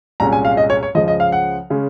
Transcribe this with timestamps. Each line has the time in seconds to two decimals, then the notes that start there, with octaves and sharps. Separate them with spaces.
0.20 C2 A#2 G#3 C#4 A#5
0.33 G#5
0.45 F5
0.57 D#5
0.70 C#5
0.83 C#5
0.95 C#2 C#3 F3 D#5
1.08 D#5
1.20 F5
1.32 F#5
1.70 C#3 G#3 C#4